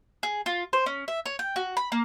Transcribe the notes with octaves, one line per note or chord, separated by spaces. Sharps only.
G#4
F4
C5
C#4
E5
C#5
G5
F#4
B5
A#3